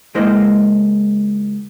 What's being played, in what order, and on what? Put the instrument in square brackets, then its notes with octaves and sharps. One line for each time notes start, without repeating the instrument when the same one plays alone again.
[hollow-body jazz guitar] C#2 G#3 A#3 E4 C5 D#5